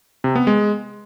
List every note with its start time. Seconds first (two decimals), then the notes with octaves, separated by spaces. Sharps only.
0.24 C3
0.35 B3
0.47 G#3